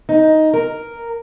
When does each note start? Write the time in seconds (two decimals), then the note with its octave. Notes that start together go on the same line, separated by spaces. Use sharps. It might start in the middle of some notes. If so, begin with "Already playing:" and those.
0.09 D#4
0.54 A#4